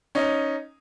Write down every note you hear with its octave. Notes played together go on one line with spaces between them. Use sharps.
C#4 D#4